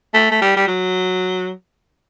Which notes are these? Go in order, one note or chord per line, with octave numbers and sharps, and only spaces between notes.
A3
A3
G3
G3
F#3